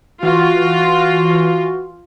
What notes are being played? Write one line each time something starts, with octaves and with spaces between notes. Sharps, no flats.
E3 F4 F#4